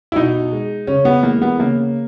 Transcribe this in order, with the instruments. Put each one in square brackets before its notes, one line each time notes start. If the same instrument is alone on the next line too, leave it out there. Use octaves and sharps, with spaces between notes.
[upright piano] E4
B2 D#4
G#3
C#3 C#4
B3
E3 G#3 A#3
B3
C#3 A#3